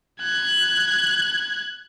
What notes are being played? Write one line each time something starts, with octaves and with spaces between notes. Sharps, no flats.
F#6 G#6